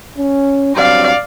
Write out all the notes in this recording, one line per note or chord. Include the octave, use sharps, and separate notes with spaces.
C#4
G2 F#3 C4 D5 F5